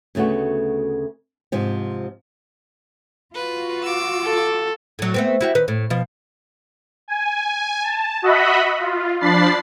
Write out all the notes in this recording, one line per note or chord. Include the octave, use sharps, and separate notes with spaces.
D2 C#3 A3 B3 F#4
G#2 C3 F3
F4 F#4 B4
D6 E6
A4
A2 F#3
A3 B3 C4
E4 F#4 G4
D#3 B4
A2
B2 F3
G#5
A5
F#4 D#5 E5 F#5 B5
F4
F3 D4 B5 A6 C7